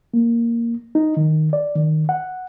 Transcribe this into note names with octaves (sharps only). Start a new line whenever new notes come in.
A#3
D#4
D#3
D5
D#3
F#5